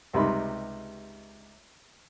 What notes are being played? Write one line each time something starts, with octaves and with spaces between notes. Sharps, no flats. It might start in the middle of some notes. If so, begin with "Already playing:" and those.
C#2 C3 G3 D#4 B5 C6